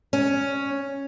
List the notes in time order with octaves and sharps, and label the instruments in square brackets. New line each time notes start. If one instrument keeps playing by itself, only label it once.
[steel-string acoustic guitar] C#4